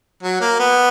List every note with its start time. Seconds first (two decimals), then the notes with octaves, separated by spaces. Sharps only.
0.23 F#3
0.41 A#3
0.60 B3